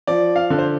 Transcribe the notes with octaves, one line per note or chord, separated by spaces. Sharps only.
F3 D5
F5
D3
C5